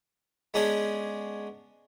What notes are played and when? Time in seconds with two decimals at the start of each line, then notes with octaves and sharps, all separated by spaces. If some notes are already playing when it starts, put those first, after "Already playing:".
0.54 G#3 B3 C#4 D4 G#4 G#5